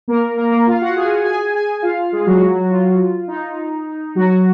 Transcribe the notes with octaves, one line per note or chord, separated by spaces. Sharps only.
A#3 A#4
A#3 A#4
A#3 A#4
F4 F5
F#4 F#5
G#4 G#5
G#4 G#5
G#4 G#5
F4 F5
G#3 G#4
F#3 F#4
F4
D#4
F#3 F#4